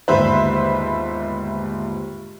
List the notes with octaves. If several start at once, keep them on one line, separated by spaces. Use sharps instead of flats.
G1 D#2 G#2 B4 C5 E5